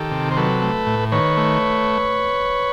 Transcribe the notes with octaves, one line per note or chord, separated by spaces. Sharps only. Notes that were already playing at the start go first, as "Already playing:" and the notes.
Already playing: D#3 G4 A4
C3
C5
F#3 A4 B4
A3
A2
D#3 B4 C#5
A3